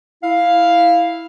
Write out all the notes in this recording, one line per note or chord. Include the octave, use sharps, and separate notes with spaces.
E4 F5